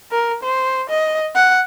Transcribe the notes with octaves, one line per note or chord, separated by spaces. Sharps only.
A#4
C5
D#5
F#5